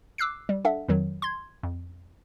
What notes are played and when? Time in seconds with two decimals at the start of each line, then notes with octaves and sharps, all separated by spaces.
0.18 D6 E6 F#6 C7
0.49 G3
0.65 D4 A4 E5 F#5
0.88 F2 D#3 F#3
1.22 C6 G#6
1.63 F2